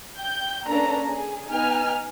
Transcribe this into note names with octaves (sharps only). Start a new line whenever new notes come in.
G5 G6
A#3 C#4 D4 A4 B4 A#5
G#4
B3 D#4 G#5 F6